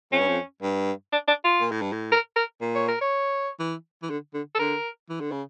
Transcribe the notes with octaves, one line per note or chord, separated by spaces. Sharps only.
F2 C#4
G2
F2
G2
D4
D4
F4
A#2
A2
G2
A2
A#4
A#4
A#2
C#5
A#4
C#5
E3
E3
D3
D3
A4
D3 A#4
E3
D3
C#3